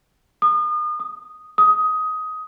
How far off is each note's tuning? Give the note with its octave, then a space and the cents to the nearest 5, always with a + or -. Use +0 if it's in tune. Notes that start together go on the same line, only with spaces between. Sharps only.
D#6 -35
D#6 +0
D#6 +15